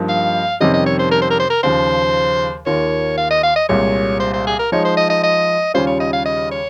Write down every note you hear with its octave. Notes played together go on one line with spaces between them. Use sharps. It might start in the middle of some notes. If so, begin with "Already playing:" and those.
Already playing: G2 F3 A#3 D#4
F5
F2 C3 D#3 G3 C#4 D#5
D#5
C#5
C5
A#4
C5
A#4
C5
A#4
D#2 C#3 F3 C5
D#2 D#3 A#3 F4 A#4 C#5
F5
D#5
F5
D#5
C2 A#2 G#3 C#5
C5
C5
G#4
A#4
F3 G#3 D#4 C#5
C5
D#5
D#5
D#5
D#2 C#3 G3 C#4 F4 C5
C#5
D#5
F5
D#5
C#5